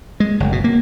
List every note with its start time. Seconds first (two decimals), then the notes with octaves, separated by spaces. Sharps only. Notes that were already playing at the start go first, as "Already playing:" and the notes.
0.20 G#3
0.40 F#1
0.52 B2
0.64 A#3